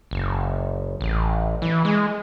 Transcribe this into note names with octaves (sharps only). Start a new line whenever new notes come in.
F#1
A1
E3
G#3